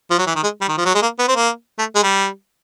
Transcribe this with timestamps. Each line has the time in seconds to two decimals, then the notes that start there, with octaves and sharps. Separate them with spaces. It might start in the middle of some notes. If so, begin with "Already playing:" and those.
0.11 F3
0.19 F#3
0.27 E3
0.36 D#3
0.43 G#3
0.61 G3
0.69 D#3
0.78 F3
0.85 F#3
0.95 G#3
1.02 A#3
1.19 B3
1.28 C4
1.36 A#3
1.79 A3
1.95 G#3
2.03 G3